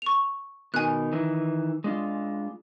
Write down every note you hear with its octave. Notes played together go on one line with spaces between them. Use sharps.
C#6 F7
B2 D#3 G#5 F#6
D#3 E3
G#3 D4 F4